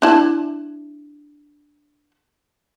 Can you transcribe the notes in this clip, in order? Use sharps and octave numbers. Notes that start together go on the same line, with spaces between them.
D4 E4 A5